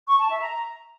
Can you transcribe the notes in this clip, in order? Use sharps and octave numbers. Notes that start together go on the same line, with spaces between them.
C#6
A5
E5
A#5